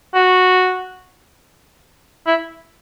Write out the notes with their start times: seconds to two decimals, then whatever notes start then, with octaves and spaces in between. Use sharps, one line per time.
0.15 F#4
2.27 E4